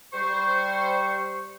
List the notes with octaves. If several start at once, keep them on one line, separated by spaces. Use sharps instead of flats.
G3 C5 C#6